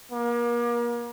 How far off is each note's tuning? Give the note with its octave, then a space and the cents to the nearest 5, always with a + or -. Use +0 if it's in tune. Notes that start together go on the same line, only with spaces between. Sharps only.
A#3 +35